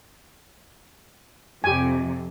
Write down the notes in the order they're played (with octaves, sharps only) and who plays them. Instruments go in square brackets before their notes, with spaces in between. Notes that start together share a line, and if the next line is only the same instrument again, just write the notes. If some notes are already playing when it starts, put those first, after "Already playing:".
[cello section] F2 C3 [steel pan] G4 G#5